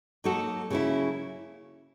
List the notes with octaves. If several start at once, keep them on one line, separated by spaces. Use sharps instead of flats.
F#3 A#3 D#4 F#4 A4
C#3 F#3 A#3 C#4 E4